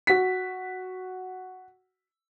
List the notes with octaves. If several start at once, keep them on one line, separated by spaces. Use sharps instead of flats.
F#4 B6